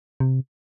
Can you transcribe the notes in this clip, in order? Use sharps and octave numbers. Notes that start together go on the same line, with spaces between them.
C3